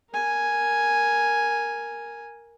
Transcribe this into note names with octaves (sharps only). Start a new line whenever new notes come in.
A#4 G#5